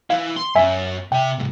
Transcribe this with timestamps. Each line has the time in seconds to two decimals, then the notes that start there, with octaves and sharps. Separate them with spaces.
0.10 E3 E4 F5
0.36 C6
0.55 F#2 C#4 E5 G#5
1.12 C3 E5 G5
1.38 C2 G#2